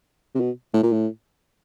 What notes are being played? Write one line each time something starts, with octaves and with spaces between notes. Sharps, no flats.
C3
B2
A2
A#2
A2